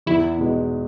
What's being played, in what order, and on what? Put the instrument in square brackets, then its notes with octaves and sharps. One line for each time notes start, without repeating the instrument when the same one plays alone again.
[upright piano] E2 [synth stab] E4
[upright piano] B2 G#3